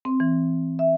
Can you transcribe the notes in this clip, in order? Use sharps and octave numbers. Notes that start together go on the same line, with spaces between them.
C4
E3
E5